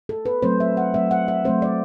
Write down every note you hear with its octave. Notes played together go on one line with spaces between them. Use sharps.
A4
B4
F#3 A3 C4 C5
E5
F#5
F#3 A3 C4 E5
F#5
E5
F#3 A3 C4 C5
D5